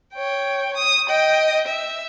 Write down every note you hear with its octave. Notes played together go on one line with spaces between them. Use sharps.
C#5 G5
D#6
D#5 G5
E5